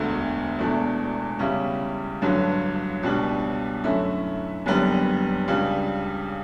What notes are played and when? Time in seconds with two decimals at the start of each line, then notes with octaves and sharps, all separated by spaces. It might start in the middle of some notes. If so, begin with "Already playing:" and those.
Already playing: E1 D2 D3 A3
0.59 E1 E2 B2 A3 D4
1.39 E2 C#3 G3 C#4 E4
2.22 A1 G2 D3 F#3
3.03 C#2 B2 G3 D4
3.84 F#2 D3 A3 C#4 E4
4.66 F#1 F#2 D3 G3 B3
5.48 C#2 C#3 G3 D4